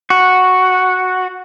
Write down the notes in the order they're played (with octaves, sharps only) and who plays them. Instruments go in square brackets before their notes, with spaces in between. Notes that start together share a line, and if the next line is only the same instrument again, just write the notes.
[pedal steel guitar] F#4